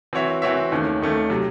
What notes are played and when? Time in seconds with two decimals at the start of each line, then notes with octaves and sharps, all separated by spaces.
0.13 E3 C4 F#4 C#5 E5
0.42 E3 C4 F#4 C#5 E5
0.72 D#2 D#3 A3 C#4
1.01 D#2 D#3 A3 C#4
1.30 C3 F#3